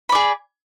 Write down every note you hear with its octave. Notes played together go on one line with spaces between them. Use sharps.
G#4 D5 B5